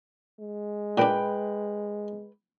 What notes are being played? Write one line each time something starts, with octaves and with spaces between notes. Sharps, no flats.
G#3
A#2 D4 B4 G5